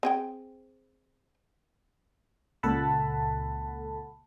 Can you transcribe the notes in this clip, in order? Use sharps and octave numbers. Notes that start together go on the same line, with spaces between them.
C4 G#4 G5
C#2 A#2 A4 F#5 A5 B5